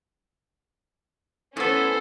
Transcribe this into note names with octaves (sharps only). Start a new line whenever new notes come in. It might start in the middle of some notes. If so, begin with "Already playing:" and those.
A2 B3 C#4 A4 C5